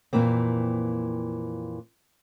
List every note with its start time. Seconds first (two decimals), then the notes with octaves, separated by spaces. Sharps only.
0.13 F2 A#2 E3 A#3 C4